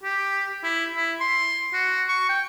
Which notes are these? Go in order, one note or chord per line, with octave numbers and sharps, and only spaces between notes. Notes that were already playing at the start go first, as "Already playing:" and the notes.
G4
E4
E4
C6
F#4
C#6
G5